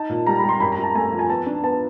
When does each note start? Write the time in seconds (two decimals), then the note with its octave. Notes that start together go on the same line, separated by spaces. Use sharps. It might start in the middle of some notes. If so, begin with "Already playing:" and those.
Already playing: D#4 A5
0.10 A#2
0.27 G3 A#5
0.39 B5
0.44 G3
0.49 C6
0.60 F#2 B5
0.72 A#5
0.78 F#2
0.83 A5
0.95 A3 G#5
1.12 F3
1.19 G#5
1.29 B3 A5
1.46 D4
1.63 B3 A5